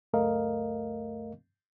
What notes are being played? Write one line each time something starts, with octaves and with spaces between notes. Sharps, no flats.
C#2 F#2 A3 A#4 D#5 F5